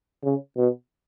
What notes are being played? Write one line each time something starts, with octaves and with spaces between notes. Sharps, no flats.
C#3
B2